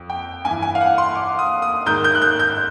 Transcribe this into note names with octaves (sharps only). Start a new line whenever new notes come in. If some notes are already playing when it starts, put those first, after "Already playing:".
Already playing: F2
G5
G2 E3 G#5
G#5
F5
F#5
C6
D6
D#6
D#6
G#2 D#3 G6
G6
F#6
G6
G6